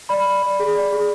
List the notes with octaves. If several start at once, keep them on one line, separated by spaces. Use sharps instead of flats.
D5 B5
D5
D5
G#4
D5
G#4